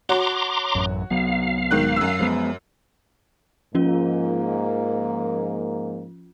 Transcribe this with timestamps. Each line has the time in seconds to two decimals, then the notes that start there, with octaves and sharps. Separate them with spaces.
0.09 F#4 C#5 A#5 C6 D6
0.75 A1 F#2
1.10 C2 F#3 B3 F5
1.71 G#2 D#3 F#6
1.96 F#2 E6
2.19 F3 G#3 B3
3.75 G#2 F3 A#3 C#4 F4